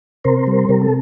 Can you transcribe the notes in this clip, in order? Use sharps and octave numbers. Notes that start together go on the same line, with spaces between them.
C3 A#4 C5
G3
C3 A#4
A4